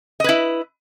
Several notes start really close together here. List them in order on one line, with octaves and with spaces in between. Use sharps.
D#5 B4 E4